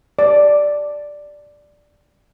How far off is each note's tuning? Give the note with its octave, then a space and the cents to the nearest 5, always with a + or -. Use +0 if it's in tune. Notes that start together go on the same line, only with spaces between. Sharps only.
D5 +0